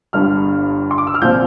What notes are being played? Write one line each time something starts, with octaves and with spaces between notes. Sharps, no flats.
G1 G2 D3 G3 F6
C6
D6
E6
F6
A#1 A#2 F3 C4 G6